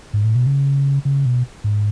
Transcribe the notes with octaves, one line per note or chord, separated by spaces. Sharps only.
G#2
A2
B2
C#3
C#3
B2
G#2